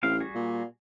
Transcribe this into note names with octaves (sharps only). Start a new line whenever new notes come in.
A1 C4 F5
G3 F#4 G#4
A#2